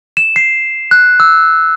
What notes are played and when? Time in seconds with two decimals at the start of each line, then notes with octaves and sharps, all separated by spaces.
0.17 E7
0.36 C7
0.91 F#6
1.20 E6